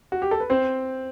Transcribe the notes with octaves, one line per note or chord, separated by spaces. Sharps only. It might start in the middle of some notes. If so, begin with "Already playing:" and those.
F#4
G4
A4
B4
C4 C5